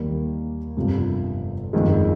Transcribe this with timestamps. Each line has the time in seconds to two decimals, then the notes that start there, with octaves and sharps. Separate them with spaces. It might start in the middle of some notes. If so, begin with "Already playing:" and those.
Already playing: D#2 D#3 G3 A#3
0.77 G1 F2 C3 F3
1.73 G1 F2 D#3 G#3